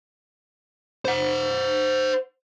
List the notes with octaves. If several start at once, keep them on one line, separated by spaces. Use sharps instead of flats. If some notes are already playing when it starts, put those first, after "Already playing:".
C5 F#5